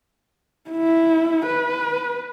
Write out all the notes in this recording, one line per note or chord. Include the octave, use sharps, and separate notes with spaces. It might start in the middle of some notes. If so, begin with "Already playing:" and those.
E4
B4